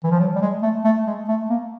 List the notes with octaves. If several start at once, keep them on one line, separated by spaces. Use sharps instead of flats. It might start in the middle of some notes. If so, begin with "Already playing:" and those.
E3
F3
F#3
G3
G#3
A3
A3
G#3
A3
A#3